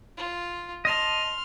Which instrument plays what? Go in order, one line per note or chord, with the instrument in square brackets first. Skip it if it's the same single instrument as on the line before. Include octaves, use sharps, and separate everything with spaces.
[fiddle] F4
[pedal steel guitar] D#5 A5 [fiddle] C6 F6